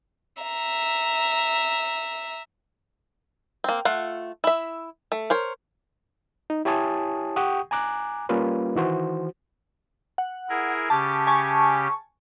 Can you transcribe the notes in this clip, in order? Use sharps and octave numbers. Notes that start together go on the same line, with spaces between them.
E5 A#5
A#3 C4
A3 F4 F#5
E4 E5
A3
A#4 C5 C#5
D#4
E4 G4 C#5 G#5 A5 D#6
G4 F#5 G5 C#6 D#6
G#5 A#5 D6 F#6
G3 A#3 C#4 F4 B4
D#3 E3 F#4 C5
F#5
E4 G#4 A#4
C#3 C#4 G4 A5
G#5 A5 C#6